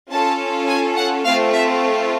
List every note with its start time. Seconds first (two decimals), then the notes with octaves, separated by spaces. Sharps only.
0.11 C#4 F4 A4 A5
0.68 G#5
0.96 F#5
1.25 A3 C4 F4 F5
1.53 E5